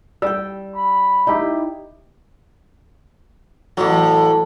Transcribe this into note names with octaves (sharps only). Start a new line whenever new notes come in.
G3 G5 E6
B5
D#4 E4 G4
A1 A2 F#3